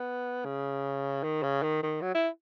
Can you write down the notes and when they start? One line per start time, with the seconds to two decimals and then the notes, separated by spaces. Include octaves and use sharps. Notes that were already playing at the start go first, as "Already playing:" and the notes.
Already playing: B3
0.45 C#3
1.23 D#3
1.43 C#3
1.63 D#3
1.83 D#3
2.02 F#3
2.15 E4